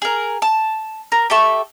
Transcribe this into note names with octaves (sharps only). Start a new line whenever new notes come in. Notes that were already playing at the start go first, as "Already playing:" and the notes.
G#4 A#4
A5
A#4
G4 A4 E5 C#6